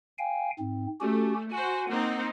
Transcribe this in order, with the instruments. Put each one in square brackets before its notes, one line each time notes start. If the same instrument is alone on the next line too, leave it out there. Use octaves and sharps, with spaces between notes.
[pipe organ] F5 G5 G#5
G#2 C4
[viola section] A3 [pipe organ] C#4 F#4 G4
[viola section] F#4 C5 [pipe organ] G#5
[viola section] A#3 C4 D#4 [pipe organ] F#5